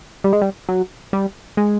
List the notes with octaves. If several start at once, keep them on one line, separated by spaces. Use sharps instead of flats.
G3
G#3
G3
F#3
G3
G#3